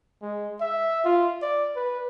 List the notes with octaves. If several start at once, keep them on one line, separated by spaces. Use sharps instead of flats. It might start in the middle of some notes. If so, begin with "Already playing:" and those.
G#3
E5
F4
D5
B4